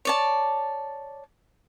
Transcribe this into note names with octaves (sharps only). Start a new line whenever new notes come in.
C#5 D5 A5